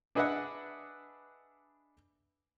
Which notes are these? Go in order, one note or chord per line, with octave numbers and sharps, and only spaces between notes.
D4 G#4 B4 D#5 E5 F#5